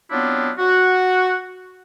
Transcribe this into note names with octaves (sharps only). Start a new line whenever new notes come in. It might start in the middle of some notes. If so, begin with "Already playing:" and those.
F#3 B3 C4 D4 E4 F4
F#4